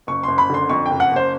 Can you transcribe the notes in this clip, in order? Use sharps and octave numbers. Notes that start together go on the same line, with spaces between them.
F#1 C#6
F#1 C6
B5
D3 C6
F2 C#6
F#1 G5
F#5
F#1 C5